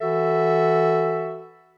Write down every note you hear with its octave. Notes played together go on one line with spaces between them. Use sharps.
E3 F#4 A4 E5